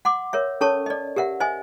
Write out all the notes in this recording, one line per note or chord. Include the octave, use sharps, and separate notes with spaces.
F#5 C6 D6
A#4 C#5 E5
C#4 A4 A#4 C#5 A5 C#6
D5 D#5
G4 A#4 E5 F#5
C5 D#5 E5 G#5